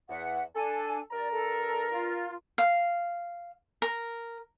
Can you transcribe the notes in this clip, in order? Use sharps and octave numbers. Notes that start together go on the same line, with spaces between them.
E2 E5 F#5
D4 A4 G#5
G2 A#4 D5 A#5
A4
F4
F5
A#4